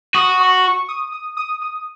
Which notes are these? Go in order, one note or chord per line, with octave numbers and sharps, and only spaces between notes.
F#4 D#6
C#6
C#6
D#6
D#6
D#6
D#6